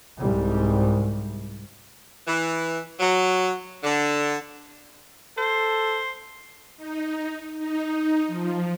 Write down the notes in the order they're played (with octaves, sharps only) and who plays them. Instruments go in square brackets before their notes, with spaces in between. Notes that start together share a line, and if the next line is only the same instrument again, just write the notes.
[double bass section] C2 G#2 G3
[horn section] E3
F#3
D3
[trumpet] A4 [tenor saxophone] C5
[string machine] D#4
D#4
F3